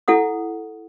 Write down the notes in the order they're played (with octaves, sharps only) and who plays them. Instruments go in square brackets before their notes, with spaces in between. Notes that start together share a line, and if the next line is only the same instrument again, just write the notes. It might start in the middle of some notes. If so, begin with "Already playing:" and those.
[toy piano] E4 A4 F#5 D#6